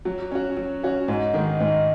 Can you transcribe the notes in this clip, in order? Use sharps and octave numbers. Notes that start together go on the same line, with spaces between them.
F#3
C#4 F#4
F#3
C#4 F#4
G#2
D#3 G#3
G#2